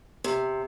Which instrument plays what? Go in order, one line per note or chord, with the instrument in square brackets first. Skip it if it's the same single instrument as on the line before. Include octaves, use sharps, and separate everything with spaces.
[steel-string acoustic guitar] C3